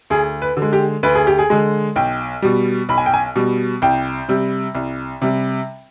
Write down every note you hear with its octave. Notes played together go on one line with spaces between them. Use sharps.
D2 G#4
B4
D3
G#3
G4
D2 B4
G#4
G4
G#4
D3 G#3
B1 G5
B2 G3
B1 B5
G#5
G5
G#5
B2 G3
C2 G5
C3 G3
C2
C3 G3